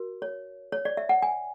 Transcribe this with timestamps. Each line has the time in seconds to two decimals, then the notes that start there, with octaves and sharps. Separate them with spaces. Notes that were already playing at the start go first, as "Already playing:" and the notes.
Already playing: F#4 A#4
0.22 C#5
0.72 C#5
0.85 D5
0.97 E5
1.09 F#5
1.22 G#5